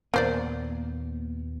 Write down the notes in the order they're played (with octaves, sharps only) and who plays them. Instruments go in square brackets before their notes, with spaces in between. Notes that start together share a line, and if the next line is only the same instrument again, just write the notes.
[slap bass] D#2 A#2 B3 [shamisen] A#3 C5 D5